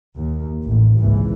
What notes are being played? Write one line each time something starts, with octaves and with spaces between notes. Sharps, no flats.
D#2
A1
G#1 C#2 A#2 E3